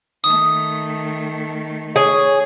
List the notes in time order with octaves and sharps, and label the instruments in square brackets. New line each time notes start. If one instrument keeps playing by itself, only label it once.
[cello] D#3 A3 [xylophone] D#6
[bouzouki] G#4 [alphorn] C#5